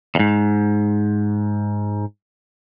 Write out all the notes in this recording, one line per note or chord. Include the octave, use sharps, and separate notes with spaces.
E2 G#2